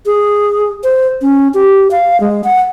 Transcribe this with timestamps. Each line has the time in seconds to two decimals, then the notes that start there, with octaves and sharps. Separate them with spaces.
0.06 G#4
0.84 C5
1.22 C#4
1.54 G4
1.91 F5
2.20 G#3
2.44 F#5